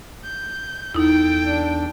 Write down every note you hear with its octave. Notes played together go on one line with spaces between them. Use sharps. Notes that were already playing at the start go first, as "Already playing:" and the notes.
G6
E2 D#4 E4 A4 G5
D4